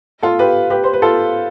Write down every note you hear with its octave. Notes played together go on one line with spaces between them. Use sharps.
F4 A4
G4 B4
G4 B4
C5
B4
F4 A4